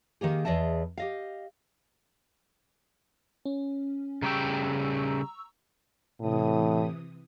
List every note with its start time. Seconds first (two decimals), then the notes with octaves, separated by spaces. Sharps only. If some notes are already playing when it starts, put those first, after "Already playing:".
0.21 D#3 A#3 G4 G#4
0.45 E2 G#4 D#5 E5 A5
0.98 G4 D#5 F5
3.46 C#4
4.22 C#3 G3 G5 A#5 C#6 E6
6.20 A2 C3 E3 D#6